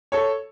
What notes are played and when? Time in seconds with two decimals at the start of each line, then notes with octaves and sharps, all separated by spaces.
0.12 A4 C#5